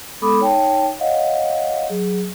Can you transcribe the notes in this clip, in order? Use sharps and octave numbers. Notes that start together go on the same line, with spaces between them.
G#3 B3 A4 B5 D6 D#6
D#4 C#5 G5 A5
C#5 D#5 F5 F#5
F#3 G#4